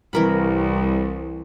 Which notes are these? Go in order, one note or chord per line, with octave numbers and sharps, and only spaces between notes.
C2 E3 A#4 B5